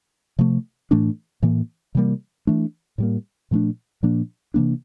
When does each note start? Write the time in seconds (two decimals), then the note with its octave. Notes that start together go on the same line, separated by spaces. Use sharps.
0.39 C3 F3 A3
0.91 A2 E3 A3 D4
1.42 A2 E3 A#3
1.95 C3 E3 G3 A#3
2.47 E3 A3 D4
2.98 A2 G3 A#3
3.51 A#2 F3 A3 D4
4.03 A#2 F3 A#3 D4
4.54 C3 E3 A#3 D4